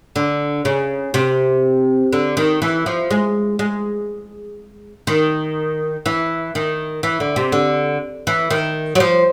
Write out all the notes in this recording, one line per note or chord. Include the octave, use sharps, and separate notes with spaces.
D3
C#3
C3
D3
D#3
E3
F3
G#3
G#3
D#3
E3
D#3
E3
D3
C3
D3
E3
D#3
F#3
F3